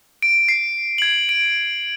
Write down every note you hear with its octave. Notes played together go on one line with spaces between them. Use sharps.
D7
C7
G#6 F#7
D7